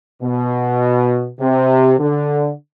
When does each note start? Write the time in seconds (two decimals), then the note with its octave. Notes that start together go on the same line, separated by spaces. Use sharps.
0.23 B2
1.40 C3
1.99 D3